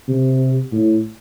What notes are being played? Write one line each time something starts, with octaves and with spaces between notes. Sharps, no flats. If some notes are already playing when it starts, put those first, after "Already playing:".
C3
A2